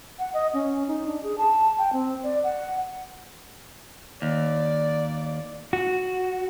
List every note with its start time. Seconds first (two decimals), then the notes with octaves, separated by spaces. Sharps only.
0.19 F#5
0.34 D#5
0.54 C#4
0.88 D#4
1.07 D4
1.23 G#4
1.38 A5
1.78 G5
1.93 C4
2.23 D5
2.44 F#5
4.22 D#2 D5
5.73 F#4